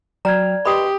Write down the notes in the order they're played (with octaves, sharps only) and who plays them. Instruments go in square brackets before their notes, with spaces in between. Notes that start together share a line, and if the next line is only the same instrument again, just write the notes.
[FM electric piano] F#3 G5 F6 [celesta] D5 G#6 [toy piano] A#5
[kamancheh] G4 [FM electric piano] B4 D#5 C6 [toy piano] B5 D#6